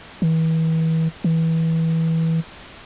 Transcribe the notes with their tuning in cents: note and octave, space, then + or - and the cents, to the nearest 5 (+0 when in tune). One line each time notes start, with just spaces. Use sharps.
E3 -35
E3 -20